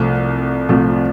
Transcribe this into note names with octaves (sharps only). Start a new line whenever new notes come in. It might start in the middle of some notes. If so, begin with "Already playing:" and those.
Already playing: C2 C3 F3 A3
C2 C3 F3 A3